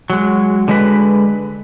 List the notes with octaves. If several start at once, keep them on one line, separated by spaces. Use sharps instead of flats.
F#3 G#3
D3 G#3 B4